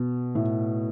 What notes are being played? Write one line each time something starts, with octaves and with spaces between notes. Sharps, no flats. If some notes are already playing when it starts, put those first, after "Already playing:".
Already playing: B2
A2